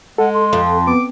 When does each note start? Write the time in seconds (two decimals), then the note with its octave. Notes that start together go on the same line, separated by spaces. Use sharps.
0.18 G#3 A4 F#5
0.34 C6
0.53 F2
0.87 B3 D6